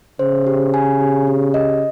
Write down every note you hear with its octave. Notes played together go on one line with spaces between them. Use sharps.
C#3 C5
G4
G#5
G4
G4
D#5